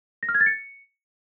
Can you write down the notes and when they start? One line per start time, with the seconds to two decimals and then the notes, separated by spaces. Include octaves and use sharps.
0.23 A#6
0.29 F6
0.34 G#6
0.40 A6
0.46 C#7